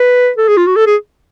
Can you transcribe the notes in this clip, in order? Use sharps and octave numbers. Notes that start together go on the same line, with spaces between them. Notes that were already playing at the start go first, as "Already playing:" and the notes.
Already playing: B4
A4
G#4
F4
F#4
A4
G#4